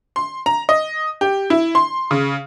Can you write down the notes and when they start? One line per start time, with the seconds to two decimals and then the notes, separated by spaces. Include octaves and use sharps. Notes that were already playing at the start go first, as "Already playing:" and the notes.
0.16 C6
0.46 A#5
0.69 D#5
1.21 G4
1.50 E4
1.75 C6
2.11 C#3